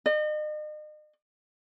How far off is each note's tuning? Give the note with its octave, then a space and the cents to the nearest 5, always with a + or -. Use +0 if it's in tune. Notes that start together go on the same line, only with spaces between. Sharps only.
D#5 -40